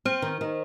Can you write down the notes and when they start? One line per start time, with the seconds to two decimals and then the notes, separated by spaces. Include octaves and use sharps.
0.05 C4 C5
0.22 D#3
0.41 D#3